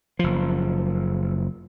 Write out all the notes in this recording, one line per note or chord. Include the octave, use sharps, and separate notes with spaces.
F#1 F3